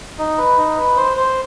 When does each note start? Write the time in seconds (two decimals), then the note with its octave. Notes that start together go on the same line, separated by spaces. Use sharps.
0.18 D#4
0.38 B4
0.57 D#4
0.77 B4
0.96 C5
1.17 C5